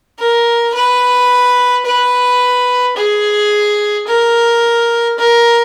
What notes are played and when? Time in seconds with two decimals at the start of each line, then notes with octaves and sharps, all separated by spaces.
0.19 A#4
0.75 B4
1.86 B4
2.97 G#4
4.07 A#4
5.19 A#4